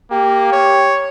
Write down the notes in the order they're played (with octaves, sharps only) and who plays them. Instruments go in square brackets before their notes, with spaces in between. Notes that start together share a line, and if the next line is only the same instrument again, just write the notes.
[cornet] A#3 [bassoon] G4
[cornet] C#5